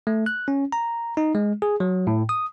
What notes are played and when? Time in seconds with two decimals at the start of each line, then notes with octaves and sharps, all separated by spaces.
0.07 A3
0.26 F#6
0.48 C#4
0.72 A#5
1.17 D#4
1.35 G#3
1.62 G#4
1.80 F#3
2.07 A2
2.29 D#6